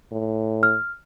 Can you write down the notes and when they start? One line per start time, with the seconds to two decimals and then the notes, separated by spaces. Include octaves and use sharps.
0.12 A2
0.63 F6